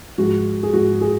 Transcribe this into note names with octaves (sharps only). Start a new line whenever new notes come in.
G#2 F3 G#3 F#4
G#4
G#2 F3 G#3 F#4
G#4